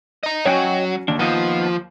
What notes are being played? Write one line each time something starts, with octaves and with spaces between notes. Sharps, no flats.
D#5 A#5
F#3 C#4 F#4 C#5 D#5 G5 G#5
D#2 D4
F3 B3 D#4 D#5